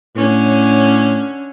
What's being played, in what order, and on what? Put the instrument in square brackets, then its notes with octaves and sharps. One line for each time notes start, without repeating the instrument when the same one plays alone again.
[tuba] A2 [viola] D3 C#4